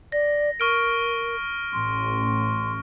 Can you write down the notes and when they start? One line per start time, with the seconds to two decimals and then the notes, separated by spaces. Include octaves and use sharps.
0.12 D5 A#6
0.60 A#4 C#6 F6 D7
1.73 A1 C6